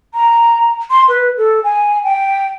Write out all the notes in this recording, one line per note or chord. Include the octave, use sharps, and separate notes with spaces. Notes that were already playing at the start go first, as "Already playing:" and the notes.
A#5
C6
B4
A4
G#5
G5